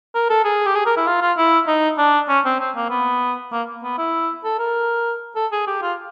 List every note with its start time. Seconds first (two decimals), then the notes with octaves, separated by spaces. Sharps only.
0.15 A#4
0.30 A4
0.44 G#4
0.66 G4
0.75 G#4
0.86 A#4
0.97 E4
1.07 F4
1.21 F4
1.37 E4
1.67 D#4
1.98 D4
2.29 C#4
2.45 C4
2.60 C4
2.76 A#3
2.90 B3
3.52 A#3
3.83 B3
3.98 E4
4.44 A4
4.59 A#4
5.36 A4
5.52 G#4
5.67 G4
5.82 F4